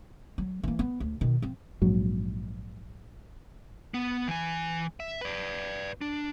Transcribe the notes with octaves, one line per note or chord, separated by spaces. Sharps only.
F#3
E3 A#3
B3
D2
B2 D#3
F3 C4
A#1 G#2 F#3
B3
E3 G#5
E5
B4 D5
D4